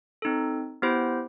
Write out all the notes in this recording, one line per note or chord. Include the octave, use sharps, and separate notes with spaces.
C4 D#4 A4
B3 E4 G4 C5